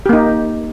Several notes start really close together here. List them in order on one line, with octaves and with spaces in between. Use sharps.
G4 A#3 D#4